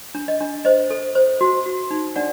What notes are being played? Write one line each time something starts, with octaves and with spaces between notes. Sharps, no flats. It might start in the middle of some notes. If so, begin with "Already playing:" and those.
D4
D#5
D4
C5 D#5
A4
C5
F#4
F#4
D#4
D4 D5 F#5